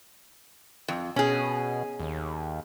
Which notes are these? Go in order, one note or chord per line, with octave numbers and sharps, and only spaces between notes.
F2
B2 C#4 G#4
D#2